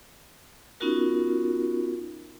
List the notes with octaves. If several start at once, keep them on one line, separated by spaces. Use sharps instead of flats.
B3 C#4 D#4 F4 F#4 A#4